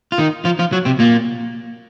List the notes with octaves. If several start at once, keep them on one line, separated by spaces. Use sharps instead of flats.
F4
D#3 D#4
F3 F4
F3 F4
F#3 F#4
C3 C4
A#2 A#3